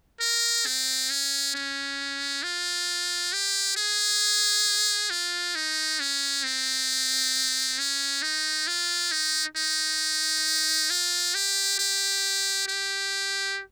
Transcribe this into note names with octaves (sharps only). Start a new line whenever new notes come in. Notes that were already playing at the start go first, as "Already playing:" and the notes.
A#4
C4
C#4
C#4
F4
G4
G#4
F4
D#4
C#4
C4
C#4
D#4
F4
D#4
D#4
F4
G4
G4
G4